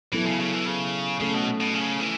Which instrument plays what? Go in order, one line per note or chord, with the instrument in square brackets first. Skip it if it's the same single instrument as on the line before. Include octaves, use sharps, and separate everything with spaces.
[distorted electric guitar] E3 [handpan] F#3 B3 E4 A4
[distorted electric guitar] C#3
C#3
E3
C#3
[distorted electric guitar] C#3 [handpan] A3 C#4 A4
[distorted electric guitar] B2
B2
C#3
E3